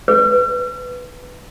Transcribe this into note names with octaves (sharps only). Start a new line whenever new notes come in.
B4